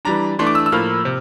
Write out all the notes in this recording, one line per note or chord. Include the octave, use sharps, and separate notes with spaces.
E3 G3 D4 A#5
E3 A3 D4 C6
D6
E6
E6
A2 F3 A#3 F6
C3